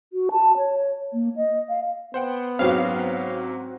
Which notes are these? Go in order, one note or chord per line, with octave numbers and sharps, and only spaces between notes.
F#4
A5
C#5
A#3
D#5
F5
B3 C5 F#5 G5
G#2 F#3 C4 C#4 F#4 F5